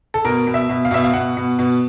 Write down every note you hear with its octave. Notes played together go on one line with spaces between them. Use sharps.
A4
B2 A#4
B2
E5
B2
F5
B2 E5
F5
B2 F#5
B2
B2